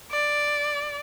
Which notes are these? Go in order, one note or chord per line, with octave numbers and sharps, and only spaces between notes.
D5